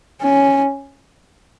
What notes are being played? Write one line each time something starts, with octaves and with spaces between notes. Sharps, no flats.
C#4